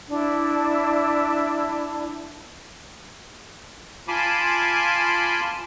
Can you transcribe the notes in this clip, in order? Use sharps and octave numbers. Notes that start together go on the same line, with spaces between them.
D4 E4
F4 G#5 A5 B5 C6 D6